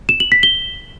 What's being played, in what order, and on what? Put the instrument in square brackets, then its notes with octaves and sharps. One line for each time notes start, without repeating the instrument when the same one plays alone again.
[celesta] E7
F#7
B6
G7